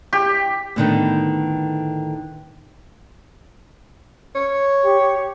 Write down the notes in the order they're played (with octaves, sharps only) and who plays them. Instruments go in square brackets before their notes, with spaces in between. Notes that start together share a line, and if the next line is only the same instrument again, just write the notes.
[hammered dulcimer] G4
[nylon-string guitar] A2 D3 D#3 B3
[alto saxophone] C#5
[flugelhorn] G4